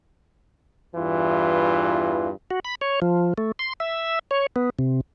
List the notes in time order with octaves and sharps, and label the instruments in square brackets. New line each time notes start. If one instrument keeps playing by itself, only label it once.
[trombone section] E2 G2 E3 F4
[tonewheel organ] F#4
B5
C#5
F3
A3
C6
E5
C#5
B3
C3